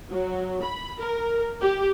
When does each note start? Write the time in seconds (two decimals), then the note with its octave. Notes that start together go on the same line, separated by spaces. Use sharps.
0.11 F#3
0.62 B5
0.99 A#4
1.61 G4